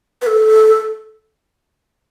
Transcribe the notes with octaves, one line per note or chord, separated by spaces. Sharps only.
B4
A4